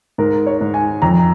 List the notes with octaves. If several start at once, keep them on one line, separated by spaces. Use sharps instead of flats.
G#2 A#4
C#5
G#2
G#5
F2 A#5